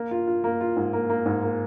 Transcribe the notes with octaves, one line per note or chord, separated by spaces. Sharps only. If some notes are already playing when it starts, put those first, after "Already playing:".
Already playing: A#3
F4
F4
A#3
F4
G#2
A#3
A#3
G#2
A#3